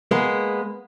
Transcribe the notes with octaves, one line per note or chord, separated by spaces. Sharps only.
G#3 A#3 B3